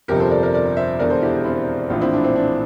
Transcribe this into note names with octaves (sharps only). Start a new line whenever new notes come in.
G1 F2 C3 F3 G4 A#4
A4 C5
A#4 D5
A#4 D5
A#4 D5
C5 E5
E1 E2 D3 A#4 D5
A4 C5
E4 G4
C4 E4
A#1 A2 E3 D4 F4
C4 E4
D4
C4
D4